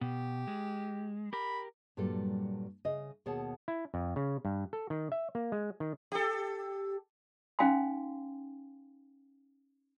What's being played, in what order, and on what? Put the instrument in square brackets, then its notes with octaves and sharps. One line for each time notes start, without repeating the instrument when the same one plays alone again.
[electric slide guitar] B2 [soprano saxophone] G4
[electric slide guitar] G#3
[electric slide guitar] G4 A#4 [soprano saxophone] B5
[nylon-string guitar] G2 A#2 F#3 G3 A4
C#3 D#5
D#2 B2 G#4 C#5 F#5 A5
[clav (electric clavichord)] E4
F2
C#3
G2
A4
D#3
E5
A#3
G#3
D#3
[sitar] G4 A4
[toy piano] C#4 D#4 F5 G5 G#5 C6